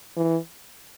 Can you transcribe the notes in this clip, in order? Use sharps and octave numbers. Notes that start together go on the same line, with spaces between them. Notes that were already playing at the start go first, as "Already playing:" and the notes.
E3